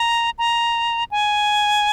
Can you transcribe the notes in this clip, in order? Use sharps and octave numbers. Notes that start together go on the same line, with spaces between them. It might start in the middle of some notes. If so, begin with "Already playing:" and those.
Already playing: A#5
A#5
G#5